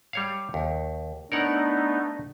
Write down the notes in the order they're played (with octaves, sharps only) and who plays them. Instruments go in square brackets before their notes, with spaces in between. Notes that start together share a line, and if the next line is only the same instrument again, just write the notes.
[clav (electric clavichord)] G3 C#5 F5
D#2
[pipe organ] A3 B3 D#4 [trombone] D4 [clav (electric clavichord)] A#4 C#5 F#5